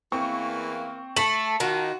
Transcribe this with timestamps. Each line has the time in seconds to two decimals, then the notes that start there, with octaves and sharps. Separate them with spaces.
0.12 E2 E3 A#3 C4 C#6
1.17 A3 A5 F#7
1.60 D#3 D#4 F4 F#4